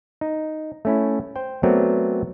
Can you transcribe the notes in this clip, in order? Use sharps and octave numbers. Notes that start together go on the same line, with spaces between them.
D#4
A3 C#4 E4
C5 G5
F#3 A3 B3 C4 A#4 D5